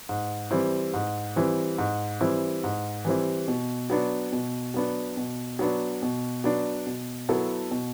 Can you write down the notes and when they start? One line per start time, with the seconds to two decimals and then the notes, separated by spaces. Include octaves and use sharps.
0.09 G#2
0.51 E3 G3 C4 E4
0.94 G#2
1.36 E3 G3 C4 E4
1.78 G#2
2.21 E3 G3 C4 E4
2.64 G#2
3.05 E3 G3 C4 E4
3.48 B2
3.90 F#3 B3 D4
4.33 B2
4.74 F#3 B3 D4
5.17 B2
5.59 F#3 B3 D4
6.02 B2
6.44 F#3 B3 D4
6.86 B2
7.29 F#3 B3 E4 A4
7.71 B2